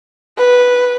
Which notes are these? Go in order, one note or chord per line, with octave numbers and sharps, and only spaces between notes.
B4